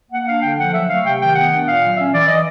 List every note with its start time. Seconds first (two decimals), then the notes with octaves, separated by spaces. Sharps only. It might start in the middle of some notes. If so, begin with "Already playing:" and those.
0.11 A#3 F#5
0.26 D4 F5
0.42 D3 G5
0.57 F3 F#5
0.72 F#3 E5
0.88 A3 F5
1.04 C3 G5
1.20 D#3 G5
1.35 B3 F#5
1.51 D4
1.66 A#2 F5
1.81 F#3
1.97 C#4 E5
2.13 E3 D5
2.28 E3 D#5